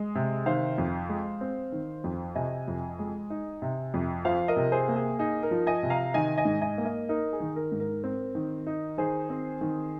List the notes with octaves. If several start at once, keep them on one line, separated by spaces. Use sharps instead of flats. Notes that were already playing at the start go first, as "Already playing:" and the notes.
Already playing: G#3
C3
D#3 C5 F5
F2
G#3
C4
D#3
F2
C3 D#5 G#5
F2
G#3
D#4
C3
F2
F3 C5 F5
A#4 D#5
C3
G#4 C5
A#3
G#4
D#4 G#4
A#4
F3
D#5 G#5
C3
F5 A#5
D#3 D#5 G#5
D#5 G#5
G#2
D#5 G#5
A#3
A#4 D#5
D#4 A#4
G#4
D#3
A#4
G#2
A#4
C4 A#4
D#3
D#4
D#3 G#4 C5
C4
D#3